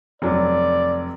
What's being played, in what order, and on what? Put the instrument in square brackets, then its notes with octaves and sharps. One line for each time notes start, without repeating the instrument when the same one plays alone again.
[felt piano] F1 F#3 [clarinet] D5